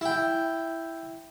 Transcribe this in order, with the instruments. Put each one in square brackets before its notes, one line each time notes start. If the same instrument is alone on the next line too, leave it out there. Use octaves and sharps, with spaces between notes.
[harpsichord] E4 G5